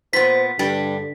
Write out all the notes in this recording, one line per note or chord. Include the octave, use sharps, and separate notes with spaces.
A#2 B3 C5 B6
G2 D3 G3